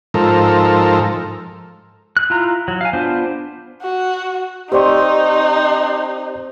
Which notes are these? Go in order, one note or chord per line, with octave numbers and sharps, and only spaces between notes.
G#2 F3 A4 A#4
F#6
E4 F4 A#5
F#3
F5 G#5
B3 D4 F4 C5
F#4
C4 D#4 G4 C5 D5 C6 C#6